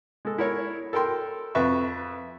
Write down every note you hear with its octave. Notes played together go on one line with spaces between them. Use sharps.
G#3 A4
E4 A#4 C#5
A4 A#4 G5 C6
F2 B4 E5 C#6